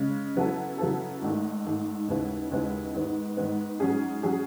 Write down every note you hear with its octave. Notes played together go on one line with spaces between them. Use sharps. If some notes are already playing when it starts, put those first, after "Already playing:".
Already playing: C#3 G#3 C#4
C#3 F#3 B3 E4 A4
C#3 F#3 B3 E4 A4
G#1 G#2 D#3 A3
G#1 G#2 D#3 A3
D#2 C#3 G#3 B3 E4
D#2 C#3 G#3 B3 E4
G#2 D#3 G#3 B3
G#2 D#3 G#3 B3
G#2 F#3 C#4 G#4
F#3 C#4 G#4